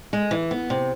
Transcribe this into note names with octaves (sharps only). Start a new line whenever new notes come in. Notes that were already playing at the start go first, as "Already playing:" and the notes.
G#3
E3
B3
C3